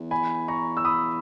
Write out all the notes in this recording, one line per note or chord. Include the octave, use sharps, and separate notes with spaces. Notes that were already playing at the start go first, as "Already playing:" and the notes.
Already playing: E2
G#5 B5
A#5 C#6
E6
B5 D#6